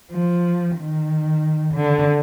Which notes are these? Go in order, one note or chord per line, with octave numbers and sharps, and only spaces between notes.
F3
D#3
D3